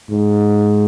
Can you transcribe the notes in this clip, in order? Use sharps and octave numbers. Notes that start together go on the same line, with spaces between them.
G#2